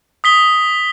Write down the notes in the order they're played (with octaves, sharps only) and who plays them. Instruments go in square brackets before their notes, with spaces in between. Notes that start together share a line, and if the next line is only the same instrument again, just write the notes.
[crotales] D#6 B6 G7